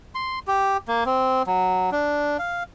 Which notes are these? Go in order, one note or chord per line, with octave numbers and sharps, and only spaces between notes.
C6
G4
A#3
C4
F#3
D4
F5